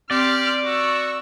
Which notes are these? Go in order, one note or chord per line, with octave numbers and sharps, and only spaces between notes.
C4 G4 D5 C6 F6
F#4 C#6 E6